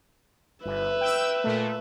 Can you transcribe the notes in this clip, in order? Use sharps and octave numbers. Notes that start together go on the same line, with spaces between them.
G1 B4 E5
G5 E6
A#2 A3